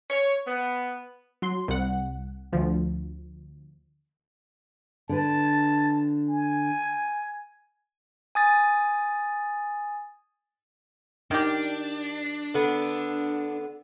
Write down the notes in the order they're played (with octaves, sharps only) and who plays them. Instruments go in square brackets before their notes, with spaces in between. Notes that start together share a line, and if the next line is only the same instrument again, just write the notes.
[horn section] C#5
B3
[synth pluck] F#3 C6
C2 F#5
D2 F3
[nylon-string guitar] D3 B4 [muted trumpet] A5
[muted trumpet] G#5
[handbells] G#5 D#6 A6
[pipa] D#3 G4 [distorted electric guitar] D4
[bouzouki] D3 B3